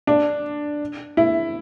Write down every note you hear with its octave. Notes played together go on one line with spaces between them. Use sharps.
D4
E4